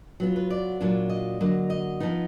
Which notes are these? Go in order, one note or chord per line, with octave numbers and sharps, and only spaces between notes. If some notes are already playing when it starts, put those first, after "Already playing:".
F#3 B3 F4
B4
D5
A#2 F#3 A#3 D4 F4
D#5
D3 F#3 A#3
D#5
F3 B3 D#4